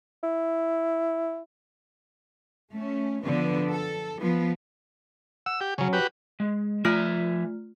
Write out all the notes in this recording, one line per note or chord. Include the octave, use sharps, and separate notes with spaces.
E4
A3 C#4
D3 F3 B3
A4
F3 B3
F#5 E6
G4
C#3 F#3 C#4
F#4 G4 B4
G#3
F3 A3 F4 E5 G#5 F6